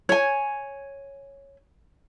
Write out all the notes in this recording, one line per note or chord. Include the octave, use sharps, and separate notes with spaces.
C#5 G#5